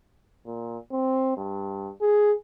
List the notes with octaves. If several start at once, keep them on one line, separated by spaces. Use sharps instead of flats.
A#2
C4
G2
G#4